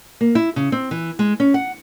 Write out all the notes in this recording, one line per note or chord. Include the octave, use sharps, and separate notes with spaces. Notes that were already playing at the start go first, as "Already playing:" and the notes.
A#3
E4
C#3
C4
E3
G#3
C#4
F#5